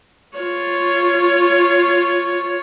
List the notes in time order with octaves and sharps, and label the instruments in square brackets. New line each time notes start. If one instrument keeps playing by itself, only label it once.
[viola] F4 C#5